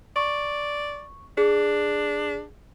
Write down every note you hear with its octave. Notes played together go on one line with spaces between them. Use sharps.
D5 C#6
D4 G#4